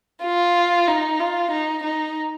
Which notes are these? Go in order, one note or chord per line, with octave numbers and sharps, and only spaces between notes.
F4
D#4
F4
D#4
D#4